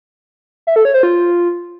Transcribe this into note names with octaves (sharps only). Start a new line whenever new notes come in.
E5
A4
C#5
C5
F4